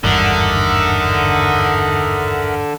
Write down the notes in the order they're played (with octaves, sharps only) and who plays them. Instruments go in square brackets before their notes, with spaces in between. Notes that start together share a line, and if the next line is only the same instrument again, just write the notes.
[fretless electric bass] G#1 E2 G2 [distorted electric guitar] D3 [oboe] D#4 [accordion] A#4 E5 F#5